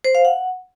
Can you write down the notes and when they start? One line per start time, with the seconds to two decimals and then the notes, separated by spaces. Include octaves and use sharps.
0.04 C5
0.15 F5
0.25 F#5